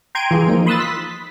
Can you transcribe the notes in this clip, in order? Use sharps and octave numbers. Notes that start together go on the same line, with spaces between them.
G5 A#5 C6 G#6 D7 D#7
E3 F4 G#4
F3 A#3 D#4
B5 C6 D#6 E6 F#6 A6
B6